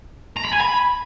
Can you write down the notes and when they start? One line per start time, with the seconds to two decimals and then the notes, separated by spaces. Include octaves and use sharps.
0.37 A#5
0.45 B5
0.53 G#5
0.61 B5